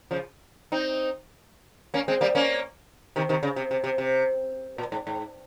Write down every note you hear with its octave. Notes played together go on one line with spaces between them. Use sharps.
C#3 F3
C4 D#4
A#3 C#4
G#3 C4
G3 A#3
A#3 C#4
C3 D#3
C3 D#3
C#3
C3
C3
C3
C3
A#2
G#2
G#2